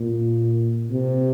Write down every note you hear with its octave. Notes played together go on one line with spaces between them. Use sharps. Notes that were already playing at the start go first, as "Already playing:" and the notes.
Already playing: A#2
C3